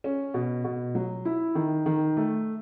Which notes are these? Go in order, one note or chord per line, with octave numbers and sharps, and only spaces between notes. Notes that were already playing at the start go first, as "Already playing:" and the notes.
C#4
B2
B2
F#3
E4
D#3
D#3
A3